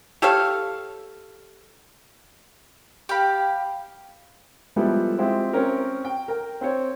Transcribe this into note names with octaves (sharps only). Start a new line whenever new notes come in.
G4 A4 C#5 F5
G4 F5 B5
F3 G3 G#3 B3 E4 A4
G#3 C4 E4 F4 G4
C4 C#4 A#4 C5
G5
A#4 G5
C4 C5 C#5